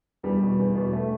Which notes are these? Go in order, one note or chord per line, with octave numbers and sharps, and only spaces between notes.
E2 G3
B2
E2
B2
A3